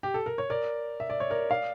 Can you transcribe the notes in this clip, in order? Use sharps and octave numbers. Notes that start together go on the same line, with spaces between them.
G4
A4
A#4
C#5
A#4 D5
E5
D5
C#5
A#4 D5
D5 F5